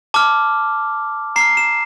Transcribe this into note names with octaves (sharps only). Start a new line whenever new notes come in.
A5 D6 F6
A#5 F6 C7
E7